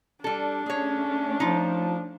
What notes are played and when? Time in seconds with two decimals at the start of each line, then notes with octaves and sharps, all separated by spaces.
0.24 G3 D4 A4
0.66 A3 C#4 G#4 C#5
1.40 F3 D#4 F4